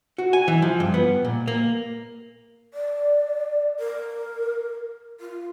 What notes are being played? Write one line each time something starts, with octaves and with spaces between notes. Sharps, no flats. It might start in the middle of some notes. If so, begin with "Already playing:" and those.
F#4
G#5
E3
F3
G2
B3
A#2
A#3
D5
A#4
F4